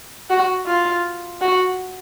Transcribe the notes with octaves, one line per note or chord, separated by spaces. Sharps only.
F#4
F4
F#4